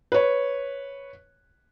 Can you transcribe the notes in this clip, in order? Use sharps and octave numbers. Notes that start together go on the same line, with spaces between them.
B4 C#5